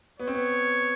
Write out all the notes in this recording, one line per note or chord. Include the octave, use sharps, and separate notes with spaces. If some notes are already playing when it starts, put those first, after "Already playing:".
B3 C#5
C4
B3